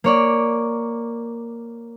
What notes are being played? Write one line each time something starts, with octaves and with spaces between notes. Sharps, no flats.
A#3 C#5 D5